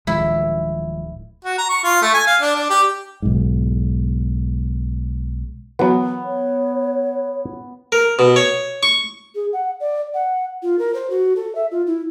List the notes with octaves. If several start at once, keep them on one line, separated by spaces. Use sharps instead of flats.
D1 B2 D#3 F3 G#3 E4
F#4
A#5
C#6
F4
A3
G#5
F5
D4
D4
G4
B1 G#2
E3 F#3 B3
C#5
A#4
B2
C#5
C#6
G#4
F#5
D5
F#5
F4
A#4
C5
F#4
A4
E5
F4
E4